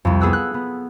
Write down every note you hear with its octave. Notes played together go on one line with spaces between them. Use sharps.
C2 F2
B3 G#4 A4 E6 F#6
F#6
B3